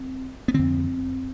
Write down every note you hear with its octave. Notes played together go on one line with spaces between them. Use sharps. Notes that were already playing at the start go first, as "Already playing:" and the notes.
Already playing: C4
B3
F2 D3 C4